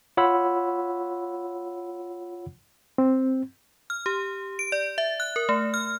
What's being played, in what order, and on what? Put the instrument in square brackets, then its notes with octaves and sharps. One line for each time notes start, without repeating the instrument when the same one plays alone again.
[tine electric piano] F4 C#5 F#5 B5 E6
[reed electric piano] C4
[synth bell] F6
G4
D7
D5
E5
F#6
A#4
A3
F6